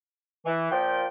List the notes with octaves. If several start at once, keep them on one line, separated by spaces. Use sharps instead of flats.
E3
A#2 F3 G5